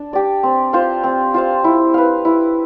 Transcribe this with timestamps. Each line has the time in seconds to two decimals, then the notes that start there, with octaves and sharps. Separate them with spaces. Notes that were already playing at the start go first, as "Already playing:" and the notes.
Already playing: D4
0.13 G4 D5
0.43 C4
0.73 F4 C5 F5
1.04 C4
1.34 F4 C5 F5
1.64 E4
1.94 B4 F5
2.25 E4